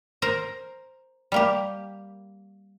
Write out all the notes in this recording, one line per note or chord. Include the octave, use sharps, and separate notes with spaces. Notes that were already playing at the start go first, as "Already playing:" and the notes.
A#4 C5 A#5
G3 A#3 G4